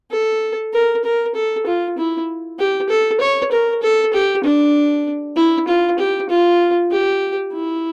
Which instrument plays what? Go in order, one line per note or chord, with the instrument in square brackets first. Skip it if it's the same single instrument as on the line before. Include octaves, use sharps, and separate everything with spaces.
[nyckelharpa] A4
A#4
A#4
A4
F4
E4
G4
A4
C#5
A#4
A4
G4
D4
E4
F4
G4
F4
G4
E4